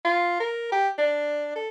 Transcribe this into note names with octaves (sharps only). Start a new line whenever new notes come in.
F4
A#4
G4
D4
A4